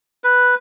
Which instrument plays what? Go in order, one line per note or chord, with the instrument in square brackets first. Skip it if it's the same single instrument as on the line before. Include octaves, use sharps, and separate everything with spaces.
[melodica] B4